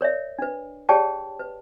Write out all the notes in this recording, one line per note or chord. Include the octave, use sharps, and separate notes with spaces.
A#4 C#5 D5 E5
D4 B4
G4 G#4 C#5 D5 G5 A5
B4